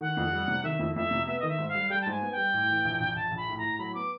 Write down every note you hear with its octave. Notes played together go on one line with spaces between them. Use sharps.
D#3 F#5
F2
G3
C3
D#3 E5
F2
F2 E5
C3
B3 E5
D#3 D#5
E5
G#2
F5
G3
G3 G5
A5
G#2
G#5
B3
G5
G3
A2
E3
A#1
A#1
A#1 A5
A#1
B5
A2
A2 A#5
F#3 B5
B3 D6